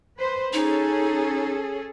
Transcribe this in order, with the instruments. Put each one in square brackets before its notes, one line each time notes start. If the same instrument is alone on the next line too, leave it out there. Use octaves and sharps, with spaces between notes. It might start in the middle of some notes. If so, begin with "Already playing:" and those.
[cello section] B4 C5
[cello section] C#4 G#4 A4 [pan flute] D#4